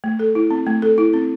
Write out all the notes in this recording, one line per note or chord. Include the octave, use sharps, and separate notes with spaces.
A3
A4
E4
C4
A3
A4
E4
C4